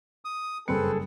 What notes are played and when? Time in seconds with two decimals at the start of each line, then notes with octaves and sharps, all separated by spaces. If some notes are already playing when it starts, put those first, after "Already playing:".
0.25 D#6
0.68 F#1 G2 C4 G#4 A4 B4 C#7